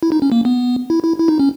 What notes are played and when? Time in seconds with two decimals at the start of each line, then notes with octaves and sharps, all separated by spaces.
0.03 E4
0.12 D#4
0.22 C#4
0.32 A#3
0.45 B3
0.90 E4
1.04 E4
1.18 E4
1.28 D#4
1.39 C#4